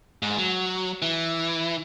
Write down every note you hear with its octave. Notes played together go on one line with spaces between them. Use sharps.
G#2
F#3
E3